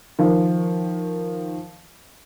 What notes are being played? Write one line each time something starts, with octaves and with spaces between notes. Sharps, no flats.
D#3 F3